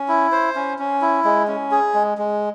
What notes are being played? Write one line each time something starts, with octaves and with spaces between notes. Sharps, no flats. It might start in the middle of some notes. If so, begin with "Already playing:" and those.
Already playing: C#4
E4
C5
C#4
C#4
E4
G#3
C#4
G#4
G#3
G#3